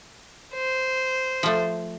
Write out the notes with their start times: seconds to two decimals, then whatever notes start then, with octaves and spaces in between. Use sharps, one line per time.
0.55 C5
1.43 F3 A3